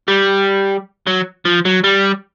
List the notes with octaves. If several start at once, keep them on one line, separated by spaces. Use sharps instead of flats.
G3
F#3
F3
F#3
G3